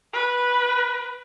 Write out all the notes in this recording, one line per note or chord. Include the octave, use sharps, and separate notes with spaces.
B4